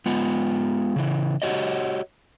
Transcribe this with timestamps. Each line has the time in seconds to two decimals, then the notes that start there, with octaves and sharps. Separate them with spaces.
0.06 G#3 B3 F4
0.96 C#3 E3
1.42 F#4 G4 C#5 D#5